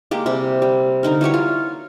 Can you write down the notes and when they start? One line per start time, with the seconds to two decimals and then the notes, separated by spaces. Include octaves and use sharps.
0.11 G#3 A#3 G4
0.26 C3 G3
0.62 G3
1.03 D3 D#4 A#4
1.21 E3 F#3 G3 C#5
1.34 F4